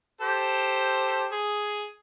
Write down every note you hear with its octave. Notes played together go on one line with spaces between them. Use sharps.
G4 A4 C5
G#4